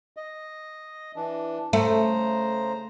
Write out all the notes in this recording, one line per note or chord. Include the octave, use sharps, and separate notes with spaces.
D#5
E3 D4
C#3 A3 C5 A#5